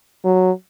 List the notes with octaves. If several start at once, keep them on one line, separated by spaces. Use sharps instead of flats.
F#3